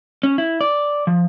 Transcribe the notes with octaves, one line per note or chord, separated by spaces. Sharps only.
C#4
E4
D5
F3